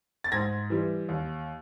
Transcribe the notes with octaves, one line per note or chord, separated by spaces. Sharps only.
A6
G#2 G#6 A#6
E3 G3
D#2